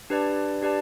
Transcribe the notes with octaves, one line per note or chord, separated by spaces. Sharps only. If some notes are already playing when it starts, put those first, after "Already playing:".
D4 G4 B4 D5 A5
D4 G4 B4 D5 A5